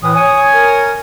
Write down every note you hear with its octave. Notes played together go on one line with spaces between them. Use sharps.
A2 E3 D#6
C#5 G#5
A#4